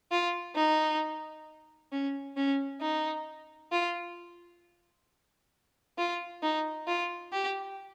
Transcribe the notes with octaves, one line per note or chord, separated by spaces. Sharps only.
F4
D#4
C#4
C#4
D#4
F4
F4
D#4
F4
G4